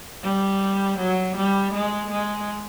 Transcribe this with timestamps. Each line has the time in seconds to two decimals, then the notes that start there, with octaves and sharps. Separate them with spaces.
0.23 G3
0.98 F#3
1.36 G3
1.73 G#3
2.11 G#3